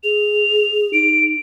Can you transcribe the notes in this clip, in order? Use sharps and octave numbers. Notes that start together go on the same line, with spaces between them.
G#4 F7
D#4 D7